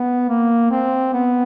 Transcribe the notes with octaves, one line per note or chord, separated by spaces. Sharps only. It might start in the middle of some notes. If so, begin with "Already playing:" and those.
Already playing: B3
A#3
C4
B3